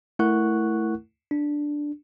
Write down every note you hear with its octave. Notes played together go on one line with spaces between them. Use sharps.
A3 E4 A#4 F#5 C#6 F#6
D4